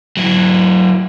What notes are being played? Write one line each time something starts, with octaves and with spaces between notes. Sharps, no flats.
F#3 E4